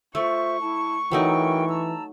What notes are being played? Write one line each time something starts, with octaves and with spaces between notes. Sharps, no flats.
A3 F4 C5 E5 C#6
E4 A5
E3 F#3 A3 D#4 F#4 A#4 G5
A5 A#5 E6